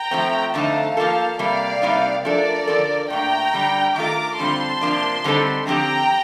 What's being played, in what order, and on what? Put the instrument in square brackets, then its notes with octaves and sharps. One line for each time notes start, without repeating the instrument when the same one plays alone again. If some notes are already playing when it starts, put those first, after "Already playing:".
Already playing: [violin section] G5 A#5
[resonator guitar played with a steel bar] F3 A3 C4
[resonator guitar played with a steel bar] F2 D3 A3 C4 D#4 [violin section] F5 A5
[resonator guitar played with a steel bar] F3 A#3 F4 A4 [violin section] F5 A5
[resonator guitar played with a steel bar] C3 G3 A#3 [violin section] D5 F5
[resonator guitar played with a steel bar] C3 G3 A#3 D#4
[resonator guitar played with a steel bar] F3 A3 D4 A4 [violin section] A#4 D5
[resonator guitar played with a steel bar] D3 F3 C4 F4 A4
[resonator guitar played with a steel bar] A#2 A3 D4 [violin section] G5 A#5
[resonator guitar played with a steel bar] D3 G3 D4
[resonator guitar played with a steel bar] D#3 A3 D4 F4 A4 [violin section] A#5 D6
[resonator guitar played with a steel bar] F2 D3 G3 C4 F4 [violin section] A5 C6
[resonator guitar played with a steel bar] C3 F3 A#3 D4
D3 G3 C4 D#4 A4
[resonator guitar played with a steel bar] D3 F3 C4 G4 [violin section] G5 A#5